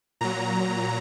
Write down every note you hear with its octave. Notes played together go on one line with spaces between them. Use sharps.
A#2 F#3 A#5